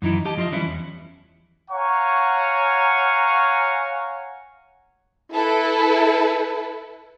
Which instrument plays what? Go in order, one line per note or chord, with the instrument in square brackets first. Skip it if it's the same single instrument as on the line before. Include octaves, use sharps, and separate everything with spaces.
[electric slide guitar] F#2 E3 D#4 E4
G4 D#5 A5
F3 F4 G4 D#5 E5
E3 G3 C#4 E4
E2
[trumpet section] C#5 F5 F#5 G#5 A#5 C#6
[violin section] E4 A4 B4